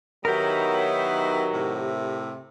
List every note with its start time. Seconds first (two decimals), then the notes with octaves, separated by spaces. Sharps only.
0.25 D#3 F#3 B3 D#4 E4 G4 A#4
1.53 A2 C3